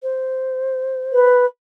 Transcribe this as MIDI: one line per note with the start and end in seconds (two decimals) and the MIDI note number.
0.03 1.28 72
1.12 1.44 71